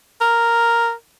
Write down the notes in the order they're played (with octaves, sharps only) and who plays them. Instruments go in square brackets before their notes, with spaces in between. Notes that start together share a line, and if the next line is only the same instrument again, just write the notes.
[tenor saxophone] A#4